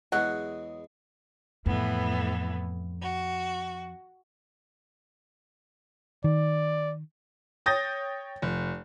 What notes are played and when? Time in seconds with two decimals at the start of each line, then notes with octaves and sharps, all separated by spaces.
0.12 E2 F#3 G#3 F#5
1.66 F2 A2 E3 B3
3.02 F#4
6.24 D#3 D5
7.66 C#5 G5 D#6 G6 A6 A#6
8.42 F1